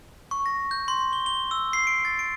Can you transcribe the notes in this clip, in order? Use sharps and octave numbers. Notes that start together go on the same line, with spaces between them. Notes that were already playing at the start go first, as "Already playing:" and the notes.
C#6
A#6
G6
C6
G7
G7
E6
C7
D7
A6
D7